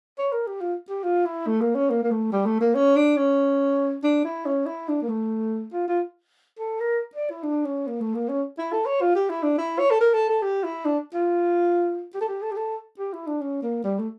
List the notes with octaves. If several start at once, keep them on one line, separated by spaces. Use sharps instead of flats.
C#5
A#4
G4
F4
G4
F4
E4
A3
A#3
C#4
A#3
A#3
A3
G3
A3
A#3
C#4
D4
C#4
D4
E4
C#4
E4
D4
A#3
A3
F4
F4
A4
A#4
D5
E4
D4
C#4
A#3
A3
A#3
C#4
E4
A4
C#5
F4
G4
E4
D4
E4
C#5
A4
A#4
A4
A4
G4
E4
D4
F4
G4
A4
G4
A4
G4
A4
G4
E4
D4
C#4
A#3
G3
A3